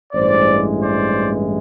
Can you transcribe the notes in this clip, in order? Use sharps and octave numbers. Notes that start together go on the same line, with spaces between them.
A1 G2 E3 G#3 C5 D5
C5 D5